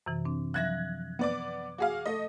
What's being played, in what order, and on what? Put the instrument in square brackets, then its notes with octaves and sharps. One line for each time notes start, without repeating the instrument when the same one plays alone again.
[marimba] F#2 C3 E3
C4 D4
[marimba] F3 F#3 E5 [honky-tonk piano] F#6 G#6 A#6
[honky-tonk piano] B3 D5 D6
F#4 G#4 F5
A3 D#5